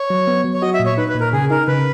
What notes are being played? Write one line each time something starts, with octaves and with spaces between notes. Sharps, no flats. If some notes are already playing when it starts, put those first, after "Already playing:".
Already playing: C#5
F#3
B3
F#3
C#5
F#4 D#5
E5
A#2
C#5
D#4 B4
B4
A#2
A#4
C#3 G#4
D#4 A#4
C#3 B4